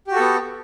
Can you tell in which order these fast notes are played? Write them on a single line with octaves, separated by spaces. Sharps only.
G4 F#4 A4 B3